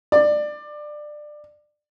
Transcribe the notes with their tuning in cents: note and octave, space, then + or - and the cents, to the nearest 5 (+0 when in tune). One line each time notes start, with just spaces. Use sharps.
D5 +20